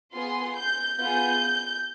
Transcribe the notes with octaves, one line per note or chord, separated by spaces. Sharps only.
B3 F4 G#4 C6
G6
B3 F4 G#4 G6